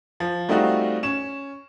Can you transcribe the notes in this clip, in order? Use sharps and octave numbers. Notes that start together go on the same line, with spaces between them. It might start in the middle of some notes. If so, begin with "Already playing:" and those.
F3
G3 A3 C4 D#4 F4 F#4
C#4 E7